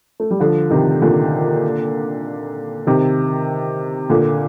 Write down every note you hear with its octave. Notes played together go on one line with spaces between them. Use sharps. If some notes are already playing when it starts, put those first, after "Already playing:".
A3
G3
D3 F3
C3 D#3
A#2 D3
C3 D#3
A#2 D3